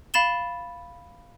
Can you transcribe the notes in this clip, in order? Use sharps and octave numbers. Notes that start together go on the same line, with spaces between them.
F5 B5 A6 E7 G7